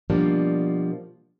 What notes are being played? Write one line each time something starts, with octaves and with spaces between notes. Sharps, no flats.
B2 F3 G3 A#3 D4